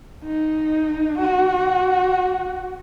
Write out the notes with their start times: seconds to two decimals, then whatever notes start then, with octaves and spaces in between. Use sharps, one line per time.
0.23 D#4
1.18 F#4